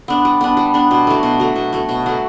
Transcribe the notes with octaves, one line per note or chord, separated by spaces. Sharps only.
B3 D4
G3
B3 D4
G3
B3 D4
B2
F#3 A3
B2
F#3 A3
B2
F#3 A3
B2
F#3 A3